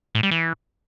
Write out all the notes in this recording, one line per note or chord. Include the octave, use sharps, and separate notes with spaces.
A2
G3
E3